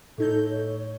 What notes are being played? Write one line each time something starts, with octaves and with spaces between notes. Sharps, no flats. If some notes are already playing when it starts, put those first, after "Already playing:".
A2 D#4 A4 G6
C#5